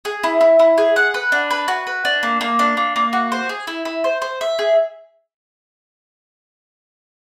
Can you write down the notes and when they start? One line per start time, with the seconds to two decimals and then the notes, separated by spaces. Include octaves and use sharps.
0.05 G#4
0.23 E4
0.41 E4
0.59 E4
0.78 G#4
0.96 F#5
1.14 B4
1.32 D4
1.50 B4
1.68 F#4
1.87 B4
2.05 D4
2.23 A#3
2.41 A#3
2.59 D4
2.77 A#3
2.96 A#3
3.13 F#4
3.32 C5
3.49 G#4
3.67 E4
3.85 E4
4.04 C5
4.22 C5
4.41 E5
4.59 G#4